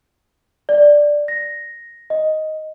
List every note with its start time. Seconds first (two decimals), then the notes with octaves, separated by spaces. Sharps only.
0.69 D5
1.28 A#6
2.10 D#5